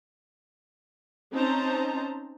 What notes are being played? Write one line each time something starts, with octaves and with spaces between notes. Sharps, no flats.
C4 C#4 D#4 C5 A5 A#5